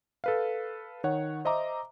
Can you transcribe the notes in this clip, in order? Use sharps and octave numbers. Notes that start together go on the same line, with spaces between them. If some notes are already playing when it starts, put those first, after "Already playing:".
A4 B4 F5
D#3 C#5 F#5
C5 D#5 E5 A#5 D6